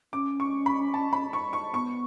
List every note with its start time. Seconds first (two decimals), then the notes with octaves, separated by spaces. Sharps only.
0.13 C#4 D6
0.40 C#6
0.66 B5
0.94 A5
1.13 B5
1.33 C#6
1.53 C#6
1.73 B3 C#6